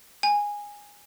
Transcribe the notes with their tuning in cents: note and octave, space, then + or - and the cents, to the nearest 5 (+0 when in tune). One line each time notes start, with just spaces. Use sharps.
G#5 -10